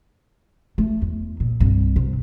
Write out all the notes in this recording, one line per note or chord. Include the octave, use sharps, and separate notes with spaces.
A3
E2
A#2
C2 G2
C3